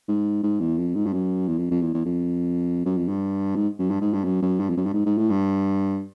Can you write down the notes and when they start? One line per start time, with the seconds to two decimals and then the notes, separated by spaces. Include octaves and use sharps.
0.08 G#2
0.43 G#2
0.60 E2
0.77 F2
0.95 G#2
1.06 G2
1.13 F#2
1.48 E2
1.58 F2
1.71 F2
1.82 E2
1.94 E2
2.05 F2
2.86 F#2
2.97 F2
3.09 G2
3.56 G#2
3.79 F#2
3.91 G2
4.01 G#2
4.13 G2
4.24 F#2
4.42 F#2
4.60 G2
4.70 F2
4.77 F#2
4.86 G2
4.94 G#2
5.06 G#2
5.18 A2
5.30 G2